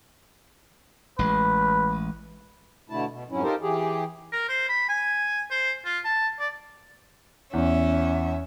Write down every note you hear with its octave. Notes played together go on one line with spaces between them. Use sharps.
A1 G#3 B4
B2 D3 A3 E4 A5
B2
F2 G#2 F#3 C#4 E4
D#4 F4 G4 A4 A#4 C5
E3 G4 G#4
A#4
C5
B5
G#5
C5
F4
A5
D5
E2 C#4 E5